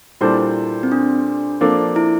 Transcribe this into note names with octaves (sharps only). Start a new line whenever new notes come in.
A#2 G3 D4 E4 A4 C5
C4
D4
F3 A#3 D4 A4 D5
E4